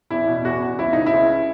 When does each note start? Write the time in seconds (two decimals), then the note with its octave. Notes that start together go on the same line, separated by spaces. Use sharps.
0.10 E2 E4
0.27 B2
0.45 E2 F#4
0.62 E2
0.79 C#2 E4
0.93 C#3 D#4
1.06 E4
1.14 C#2